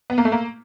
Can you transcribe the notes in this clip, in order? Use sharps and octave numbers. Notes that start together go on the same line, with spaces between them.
B3
A#3
A3
A#3